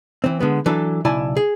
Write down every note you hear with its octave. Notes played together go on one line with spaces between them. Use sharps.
E3 C4
D3 G#3 B3
E3 F#3 D4 A4
B1 C#3 E4 D5 G#5 A5
G#4